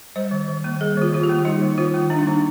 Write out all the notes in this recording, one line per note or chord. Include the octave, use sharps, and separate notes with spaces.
G3 C5
D#3
D#3
A#3
G3 G#4
D#3 F4
D#3 F4
G4
A#3
G3 D#4
D#3
D#3 F4
A#3
G3 D4
D#4
D#3 D4